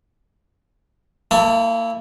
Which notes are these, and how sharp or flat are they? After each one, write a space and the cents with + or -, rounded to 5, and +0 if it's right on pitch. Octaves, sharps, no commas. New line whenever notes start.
A#3 -35 E4 -5 A5 +15